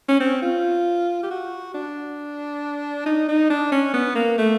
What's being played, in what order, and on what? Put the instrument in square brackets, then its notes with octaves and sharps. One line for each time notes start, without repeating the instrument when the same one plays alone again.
[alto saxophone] C#4
C4
F4
G4
F#4
D4
D#4
D#4
D4
C#4
B3
A#3
A3